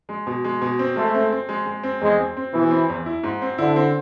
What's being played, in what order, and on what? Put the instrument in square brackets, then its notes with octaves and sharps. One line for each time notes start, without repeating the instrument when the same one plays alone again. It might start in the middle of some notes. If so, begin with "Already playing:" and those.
[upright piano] G#3
B2
G#3
B2
C4
[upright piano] G#3 [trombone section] A3
[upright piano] C4
C4
G#3
G#3
C4
[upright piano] E2 [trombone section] G#3
[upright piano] C4
C4
[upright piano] B2 [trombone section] E3
[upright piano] C4
E2
E4
G#2
C4
[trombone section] D3 [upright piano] E4
[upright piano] C4